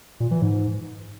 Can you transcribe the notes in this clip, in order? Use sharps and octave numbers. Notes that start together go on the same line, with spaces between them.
A#2
E3
G#2